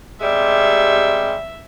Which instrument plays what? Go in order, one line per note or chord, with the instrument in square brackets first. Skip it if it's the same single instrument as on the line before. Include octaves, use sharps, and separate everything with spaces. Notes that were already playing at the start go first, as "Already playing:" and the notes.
[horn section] C3 G3 G#3 [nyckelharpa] E5